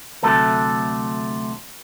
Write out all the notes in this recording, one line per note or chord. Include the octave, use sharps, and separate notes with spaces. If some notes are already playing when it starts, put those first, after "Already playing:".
D2 G2 C3 F#3 A3 A4